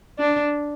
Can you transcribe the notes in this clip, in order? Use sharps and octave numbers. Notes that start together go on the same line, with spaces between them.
D4